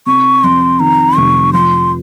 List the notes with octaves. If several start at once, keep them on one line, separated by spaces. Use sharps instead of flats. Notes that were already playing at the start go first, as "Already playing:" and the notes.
C3 C#6
F2 C6
D#3 A#5
F1 C#6
F3 C6